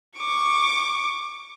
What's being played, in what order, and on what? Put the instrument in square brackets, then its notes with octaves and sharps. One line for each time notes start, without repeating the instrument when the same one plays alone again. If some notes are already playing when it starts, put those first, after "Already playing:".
[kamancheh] C#6 D6